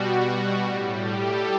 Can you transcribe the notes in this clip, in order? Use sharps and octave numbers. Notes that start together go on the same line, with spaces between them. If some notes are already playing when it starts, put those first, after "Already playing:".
Already playing: B2 G3 F#4
F#4
A2 G3 F#4
G4
A4